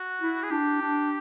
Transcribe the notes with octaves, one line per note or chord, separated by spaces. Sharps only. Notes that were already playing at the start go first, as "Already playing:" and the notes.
Already playing: F#4
E4
G#4
D4 G4
D4